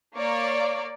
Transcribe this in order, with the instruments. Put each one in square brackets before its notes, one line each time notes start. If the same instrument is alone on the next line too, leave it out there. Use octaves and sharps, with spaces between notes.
[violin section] A#3 C#5 D5